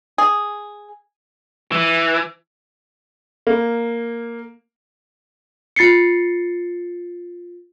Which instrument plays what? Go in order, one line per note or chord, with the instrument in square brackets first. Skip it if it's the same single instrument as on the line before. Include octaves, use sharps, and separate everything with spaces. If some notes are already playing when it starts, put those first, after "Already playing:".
[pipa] G#4
[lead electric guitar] E3
[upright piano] A#3
[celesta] F4 A6 C7 C#7